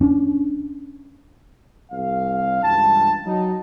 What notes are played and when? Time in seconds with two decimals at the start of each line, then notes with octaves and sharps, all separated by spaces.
0.01 C#4 D4
1.92 C2 F5
2.63 C#2 G2 E3 G5 A5
3.26 F#3 D#4